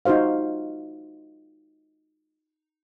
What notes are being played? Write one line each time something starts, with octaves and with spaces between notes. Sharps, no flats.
D#4 F4 F#4 C5 F5